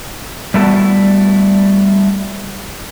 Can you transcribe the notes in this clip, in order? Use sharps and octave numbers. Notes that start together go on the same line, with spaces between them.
G3 A3 B3 E4 F#4 A4